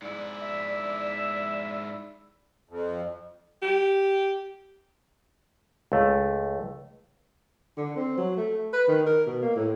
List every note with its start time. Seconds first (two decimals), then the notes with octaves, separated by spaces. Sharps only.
0.02 G#2 E4 D5
0.41 E5
2.69 F2
3.62 G4
5.92 C#2 A3
7.77 D3
7.96 C4
8.18 F#3
8.37 A3
8.73 B4
8.88 D#3
9.06 A#4
9.26 B2
9.42 A#3
9.56 A2